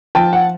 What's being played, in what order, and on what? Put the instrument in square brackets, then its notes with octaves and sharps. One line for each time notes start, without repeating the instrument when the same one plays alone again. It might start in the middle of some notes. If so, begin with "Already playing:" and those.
[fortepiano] F3 G5 A5
F#5